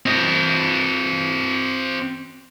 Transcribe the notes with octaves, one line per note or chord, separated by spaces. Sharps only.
C4 D#5